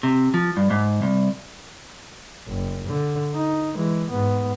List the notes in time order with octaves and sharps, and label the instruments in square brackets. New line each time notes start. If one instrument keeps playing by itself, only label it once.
[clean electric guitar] C3
F3
G2
G#2
C2
[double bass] F#1
D3
D#4
E3 G#3
G#2 B3